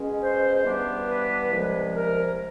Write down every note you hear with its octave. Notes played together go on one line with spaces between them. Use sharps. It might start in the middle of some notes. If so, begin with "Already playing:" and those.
Already playing: B2 G#3 C#4
C5
G2 E3 G3 B3 D4
B4
C2 C3 F3 G#3
A#4